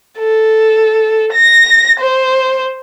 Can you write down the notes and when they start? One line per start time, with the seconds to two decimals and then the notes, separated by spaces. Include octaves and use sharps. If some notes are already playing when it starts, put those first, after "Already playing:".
0.19 A4
1.33 A#6
1.99 C5